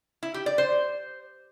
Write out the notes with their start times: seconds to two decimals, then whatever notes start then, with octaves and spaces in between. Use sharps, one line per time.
0.23 E4
0.34 G4
0.46 D5
0.58 C5